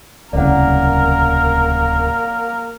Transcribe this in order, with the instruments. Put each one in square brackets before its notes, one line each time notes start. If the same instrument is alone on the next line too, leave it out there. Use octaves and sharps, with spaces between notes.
[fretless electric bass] D1 C2 C#3 [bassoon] A#3 [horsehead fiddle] A#4 [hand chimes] D5 F#5